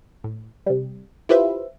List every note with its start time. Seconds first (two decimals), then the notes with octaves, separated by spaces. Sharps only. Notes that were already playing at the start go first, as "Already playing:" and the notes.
0.24 A2
0.66 C3 G3
1.29 E4 F4 G4 B4 C5 E5